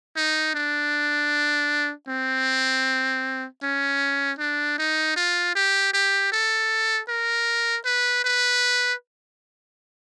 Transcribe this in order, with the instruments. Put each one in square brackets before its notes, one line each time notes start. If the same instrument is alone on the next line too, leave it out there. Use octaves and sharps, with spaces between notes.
[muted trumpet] D#4
D4
C4
C#4
D4
D#4
F4
G4
G4
A4
A#4
B4
B4